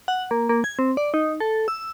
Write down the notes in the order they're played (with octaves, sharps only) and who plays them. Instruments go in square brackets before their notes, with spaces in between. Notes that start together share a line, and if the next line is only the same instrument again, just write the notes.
[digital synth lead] F#5
A#3
A#3
G#6
C4
D5
D#4
A4
E6